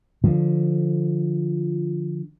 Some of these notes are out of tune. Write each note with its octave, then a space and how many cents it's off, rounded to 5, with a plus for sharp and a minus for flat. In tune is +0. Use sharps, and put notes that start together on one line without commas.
D3 +10 F3 +0